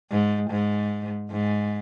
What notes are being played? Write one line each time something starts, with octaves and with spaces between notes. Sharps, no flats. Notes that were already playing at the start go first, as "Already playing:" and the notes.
G#2
G#2
G#2